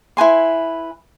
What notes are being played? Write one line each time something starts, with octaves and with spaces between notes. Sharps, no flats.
E4 B4 G#5 C6